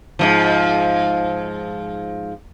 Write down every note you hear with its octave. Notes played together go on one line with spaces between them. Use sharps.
G#2 B2 F3